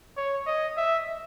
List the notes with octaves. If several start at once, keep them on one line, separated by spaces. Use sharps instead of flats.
C#5
D#5
E5